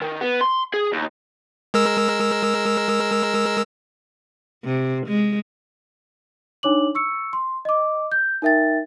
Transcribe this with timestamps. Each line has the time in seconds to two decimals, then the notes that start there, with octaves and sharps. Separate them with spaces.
0.01 D#3
0.21 B3
0.41 C6
0.74 G#4
0.93 D#2
1.74 G#3 A#4 E6
4.64 C3
5.07 G#3
6.63 D4 D#4 C#5 D6 F#7
6.95 C#6 E6 C#7
7.33 C6
7.65 D#5 D6
8.12 G6
8.42 D#4 A#4 E5 G5 A6